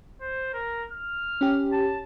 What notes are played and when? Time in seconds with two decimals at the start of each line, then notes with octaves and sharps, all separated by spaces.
0.21 C5
0.54 A#4
0.91 F6
1.41 C#4 G4
1.73 A5